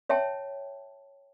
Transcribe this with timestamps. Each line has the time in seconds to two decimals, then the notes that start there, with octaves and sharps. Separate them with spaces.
0.09 C#5 E5 G5 A5